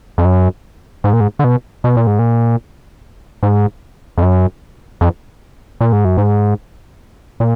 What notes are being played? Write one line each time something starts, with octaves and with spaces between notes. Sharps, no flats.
F2
F#2
G#2
A#2
G#2
D3
B2
B2
A#2
G#2
A#2
G#2
F2
F#2
F2
A#2
G#2
F#2
G#2
A#2